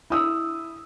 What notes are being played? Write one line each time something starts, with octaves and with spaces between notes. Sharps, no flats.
E4 D#6 E6